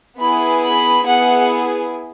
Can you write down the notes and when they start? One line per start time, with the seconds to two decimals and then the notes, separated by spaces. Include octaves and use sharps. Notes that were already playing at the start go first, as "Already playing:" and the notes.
0.19 B3 E4 G#4 B5
0.63 B5
1.05 B3 E4 G#4 F#5